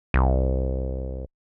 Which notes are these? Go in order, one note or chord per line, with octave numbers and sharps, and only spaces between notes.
C2